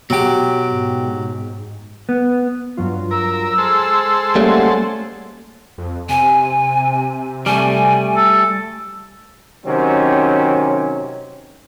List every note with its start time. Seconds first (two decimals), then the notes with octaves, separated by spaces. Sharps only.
0.10 B2 F#3 G4 G5
0.65 G#2
2.09 B3
2.77 G2 F#3 F4
3.11 A#4 E6
3.58 G#3 A4 C5 F6
4.35 G3 A3 A#3 C#4 F#5
5.78 F2
6.09 C3 G#5
7.46 G3 A3 G#5
8.16 A4
9.66 C3 D#3 F#3 C4 C#4